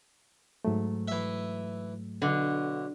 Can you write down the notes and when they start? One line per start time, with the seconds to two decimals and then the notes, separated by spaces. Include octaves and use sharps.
0.65 G#2 F#3 A3
1.08 E3 E5
2.22 B1 D3